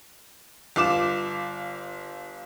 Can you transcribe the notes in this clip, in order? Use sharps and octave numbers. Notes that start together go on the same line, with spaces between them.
G1 F4 D6 E7